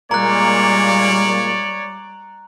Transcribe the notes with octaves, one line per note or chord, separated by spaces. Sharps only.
A#2 G3 G#3 A#3 C#5 D5 A#5 F#6